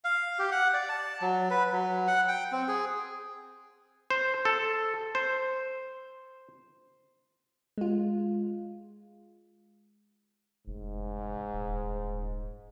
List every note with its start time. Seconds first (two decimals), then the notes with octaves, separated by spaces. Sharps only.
0.04 F5
0.39 G4
0.52 F#5
0.74 D5
0.89 A5
1.22 F#3
1.50 B4
1.72 F#3
2.07 F#5
2.28 G5
2.52 C4
2.68 G#4
4.10 C5
4.45 A4
5.15 C5
7.78 G#3 F4
10.67 F1 G#2
11.53 D#1